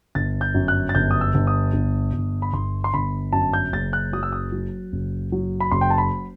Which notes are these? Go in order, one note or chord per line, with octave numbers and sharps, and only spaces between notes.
G1 A6
G6
F#2
F#6
A6
G1 G6
D#6
E6
G1
D#6
G1
G1
B5
G1 C6
C6
G1 B5
F#2 A5
G6
F#1 A6
F#6
F#3 D#6
E6
D#6
F#3
F#1
F#3
B5
F#1 C6
G5
A5
B5